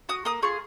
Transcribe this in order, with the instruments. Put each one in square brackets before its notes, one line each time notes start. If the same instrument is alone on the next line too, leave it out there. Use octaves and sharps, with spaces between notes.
[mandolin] F#4 D#6
A#3 D#6
F4 G#4 C#6